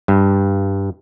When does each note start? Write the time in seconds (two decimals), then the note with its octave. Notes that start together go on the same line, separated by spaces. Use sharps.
0.08 G2